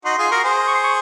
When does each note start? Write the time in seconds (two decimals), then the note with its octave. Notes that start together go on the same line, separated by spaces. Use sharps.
0.05 D#4 F#4 C6
0.18 F4 G#4
0.31 F#4 A#4
0.44 G#4 C5
0.67 C#6
0.75 C6
0.84 C#6